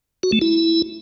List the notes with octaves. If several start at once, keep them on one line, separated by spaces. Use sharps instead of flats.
F#4
A3
E4